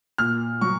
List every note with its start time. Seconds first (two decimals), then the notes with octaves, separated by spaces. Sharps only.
0.18 A#2 F6
0.61 F#3 C#6